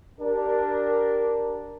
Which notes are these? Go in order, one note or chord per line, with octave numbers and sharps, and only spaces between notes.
D4 G4 A#4